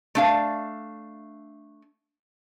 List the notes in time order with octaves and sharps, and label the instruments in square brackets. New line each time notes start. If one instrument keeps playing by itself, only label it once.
[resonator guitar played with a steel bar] A3 D4 F5